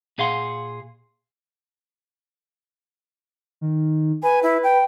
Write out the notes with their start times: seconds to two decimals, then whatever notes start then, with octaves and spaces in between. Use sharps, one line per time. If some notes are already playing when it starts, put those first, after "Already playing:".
0.18 A#2 G#4 F5 F#5 C6
3.61 D#3
4.23 B4 G#5
4.43 E4
4.63 G5